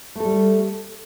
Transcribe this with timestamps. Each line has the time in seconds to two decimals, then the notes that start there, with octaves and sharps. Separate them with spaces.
0.15 A3
0.20 A4
0.25 G3